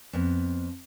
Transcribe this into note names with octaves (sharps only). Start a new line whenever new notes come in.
F2 B3